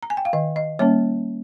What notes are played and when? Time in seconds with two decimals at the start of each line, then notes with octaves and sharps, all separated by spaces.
0.03 A#5
0.10 G#5
0.17 G5
0.25 F5
0.33 D#3 D#5
0.56 D#5
0.79 G3 A#3 C#4 C#5